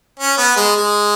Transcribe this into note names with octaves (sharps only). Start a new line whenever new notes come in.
C#4
B3
G#3
G#3